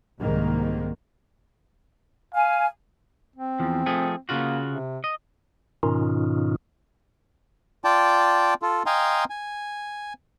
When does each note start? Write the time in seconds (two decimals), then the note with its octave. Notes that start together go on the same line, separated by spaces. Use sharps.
0.21 C2 G#2 D#3 A#3
2.34 F5 G#5
3.36 C4
3.60 E2 F3
3.86 F3 A3 G#4
4.29 C#3 A#3 F4 F#4
4.68 C3
5.04 D#5
5.83 G#2 B2 D#3 C#4 D#4 F4
7.84 F4 D5 G5 A5
8.62 F4 A4
8.86 D#5 F5 G5 G#5 A#5 C6
9.30 G#5